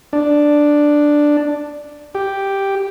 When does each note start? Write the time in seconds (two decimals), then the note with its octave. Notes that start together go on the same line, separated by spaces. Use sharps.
0.13 D4
2.15 G4